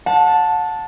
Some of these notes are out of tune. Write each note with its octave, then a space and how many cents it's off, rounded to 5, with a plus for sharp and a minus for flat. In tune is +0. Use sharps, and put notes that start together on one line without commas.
F#5 -35 A5 +0